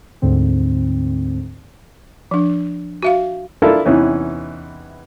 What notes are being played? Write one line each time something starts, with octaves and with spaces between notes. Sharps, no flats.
D2 G#2 D3 C4
F3 D4
F#4 E5 F5
D4 E4 F4 A4 A#4
E2 C3 E3 C#4 D#4